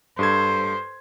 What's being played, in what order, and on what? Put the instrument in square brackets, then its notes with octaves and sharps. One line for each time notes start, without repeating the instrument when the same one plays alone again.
[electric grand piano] G2 A4 G#6 [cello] C5